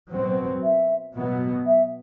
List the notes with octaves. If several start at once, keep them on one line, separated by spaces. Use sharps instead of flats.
B2 F#3 C4 C5
E5
B2 F#3 B3
E5